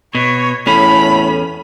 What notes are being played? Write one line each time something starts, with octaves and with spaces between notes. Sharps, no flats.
B2 C#5
E2 A2 C#4 B5